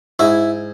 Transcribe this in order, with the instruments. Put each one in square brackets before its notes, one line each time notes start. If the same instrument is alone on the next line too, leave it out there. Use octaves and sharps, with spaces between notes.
[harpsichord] G#2 E4